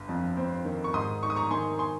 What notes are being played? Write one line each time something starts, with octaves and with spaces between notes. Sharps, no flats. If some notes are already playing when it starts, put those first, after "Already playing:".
Already playing: G1
F2
C4
D#3
C#6
G#2 C6 D#6
D#4 C#6
D#6
A#5 C#6
D#3 G#5 C6
G#5 C6